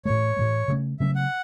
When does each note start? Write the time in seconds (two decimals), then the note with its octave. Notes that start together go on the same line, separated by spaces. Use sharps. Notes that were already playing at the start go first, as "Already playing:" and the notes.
0.05 A2 E3 A3 C#5
0.36 A2 E3 A3
0.68 C#3 F#3 A3 C#4
1.00 C#3 F#3 A3 C#4 E5
1.15 F#5